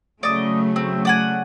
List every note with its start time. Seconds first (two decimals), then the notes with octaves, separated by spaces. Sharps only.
0.23 C#3 F#3 A3 D5 D#5
0.76 C4
1.05 D5 F#5 G#5